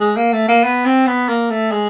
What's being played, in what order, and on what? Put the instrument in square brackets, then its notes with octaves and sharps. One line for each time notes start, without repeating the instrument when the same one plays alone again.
[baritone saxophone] G#3
A#3
A3
A#3
B3
C4
B3
A#3
A3
G#3